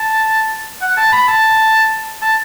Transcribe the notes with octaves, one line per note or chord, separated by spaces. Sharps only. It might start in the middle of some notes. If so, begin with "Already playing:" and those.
Already playing: A5
F#5
A5
B5
A5
A5